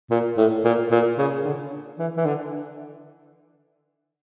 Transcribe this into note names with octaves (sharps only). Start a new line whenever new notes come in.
A#2
A2
A#2
A#2
C#3
D3
E3
E3
D3